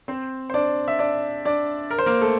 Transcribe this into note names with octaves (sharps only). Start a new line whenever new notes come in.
C4 C5
C5
D4 D5
E5
D4 D5
D4 D5
A#4
C5
A#3 A#4
A3 A4